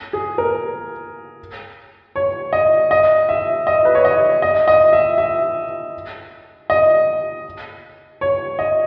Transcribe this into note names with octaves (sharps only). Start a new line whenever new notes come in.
G#4
A#4
C#5
D#5
D#5
E5
D#5
B4
C#5
D#5
D#5
D#5
E5
E5
D#5
C#5
D#5